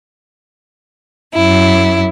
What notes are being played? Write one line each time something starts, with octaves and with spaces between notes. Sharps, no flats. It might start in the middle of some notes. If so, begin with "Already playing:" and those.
F#2 E4